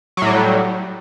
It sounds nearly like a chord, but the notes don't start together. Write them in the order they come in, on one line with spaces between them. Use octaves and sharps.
F#3 A2 G3